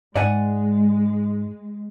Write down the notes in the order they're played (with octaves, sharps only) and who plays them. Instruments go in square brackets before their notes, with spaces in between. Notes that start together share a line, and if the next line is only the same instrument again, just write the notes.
[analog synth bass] G#2 [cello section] G#3 [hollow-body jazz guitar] D5 F#5 G#5